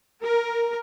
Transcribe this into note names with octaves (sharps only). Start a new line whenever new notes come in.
A#4